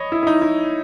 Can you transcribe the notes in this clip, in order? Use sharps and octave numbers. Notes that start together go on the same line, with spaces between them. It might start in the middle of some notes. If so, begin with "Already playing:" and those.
Already playing: C#5 D#5 B5
E4
E4
D#4
E4